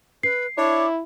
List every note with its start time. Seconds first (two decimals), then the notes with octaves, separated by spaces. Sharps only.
0.23 B4 C7
0.58 D4 E4 C#5 D6